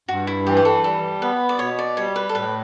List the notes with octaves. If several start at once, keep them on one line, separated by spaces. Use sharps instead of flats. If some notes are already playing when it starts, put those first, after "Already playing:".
G2 F#4
E4
E3 G4
G4
A4
G3 A4
B3 B4
D5
B2 C#5
D5
G3 C#5
B4
A4
A2 B4